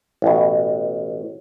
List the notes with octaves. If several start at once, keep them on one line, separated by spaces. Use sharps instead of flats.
A1 B2